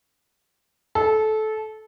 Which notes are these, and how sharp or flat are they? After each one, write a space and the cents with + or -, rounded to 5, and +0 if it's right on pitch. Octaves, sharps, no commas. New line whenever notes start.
A4 -20